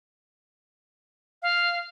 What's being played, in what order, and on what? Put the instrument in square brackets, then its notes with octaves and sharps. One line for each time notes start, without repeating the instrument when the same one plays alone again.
[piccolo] F5